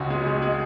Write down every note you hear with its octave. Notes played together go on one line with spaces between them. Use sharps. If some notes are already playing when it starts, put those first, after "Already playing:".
Already playing: C#2 C#3 F#4
G#3
G#3
G#3